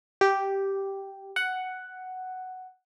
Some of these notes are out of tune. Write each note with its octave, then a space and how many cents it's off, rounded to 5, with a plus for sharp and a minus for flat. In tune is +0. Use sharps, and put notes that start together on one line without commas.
G4 -5
F#5 +5